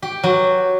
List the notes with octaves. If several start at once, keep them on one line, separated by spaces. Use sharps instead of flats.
G4
F#3